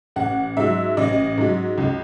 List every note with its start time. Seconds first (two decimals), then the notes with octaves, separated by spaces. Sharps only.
0.16 A1 F#5
0.57 G#2 F#3 E5
0.97 A1 D#5
1.38 G#2 F#3
1.78 C#2